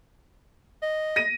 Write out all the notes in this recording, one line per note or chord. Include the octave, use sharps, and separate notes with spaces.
D#5
A#6 D#7